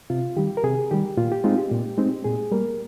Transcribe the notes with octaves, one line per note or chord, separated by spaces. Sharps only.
C3 F4
D#3 G3 G4
A#4
C3 G#4
D#3 G3 G4
A#2 F4
G4
G#3 C4 D#4 F4
G4
A#2
G#3 C4 D#4
A#2 G#4
G3 A#3 A#4